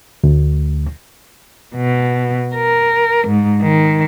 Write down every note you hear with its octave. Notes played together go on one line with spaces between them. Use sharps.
D2
B2
A#4
G#2
D#3